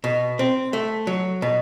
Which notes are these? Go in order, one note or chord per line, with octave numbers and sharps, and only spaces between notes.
B2
C4
A3
F#3
B2